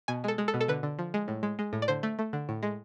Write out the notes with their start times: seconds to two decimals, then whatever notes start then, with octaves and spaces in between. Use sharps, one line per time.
0.08 B2 G#5
0.24 G#3 A4
0.38 G#3
0.48 A4
0.54 B2
0.61 A4
0.68 D3 B4
0.83 D3
0.99 F3
1.14 G#3
1.28 A2
1.43 G#3
1.59 G#3
1.73 A2
1.82 D5
1.88 D3 C5
2.03 A3
2.19 A3
2.33 D3
2.49 A2
2.63 G#3